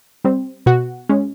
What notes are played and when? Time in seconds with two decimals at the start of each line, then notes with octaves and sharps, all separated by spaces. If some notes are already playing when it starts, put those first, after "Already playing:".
0.24 G3 C4
0.66 B2 F#4
1.09 G#3 C#4